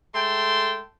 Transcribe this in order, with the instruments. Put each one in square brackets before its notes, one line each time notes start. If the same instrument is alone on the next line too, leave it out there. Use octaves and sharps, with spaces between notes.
[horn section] G#3 A3 G5 A5 C6